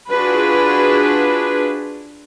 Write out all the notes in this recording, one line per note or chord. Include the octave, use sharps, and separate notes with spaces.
D4 F4 F#4 G#4 B4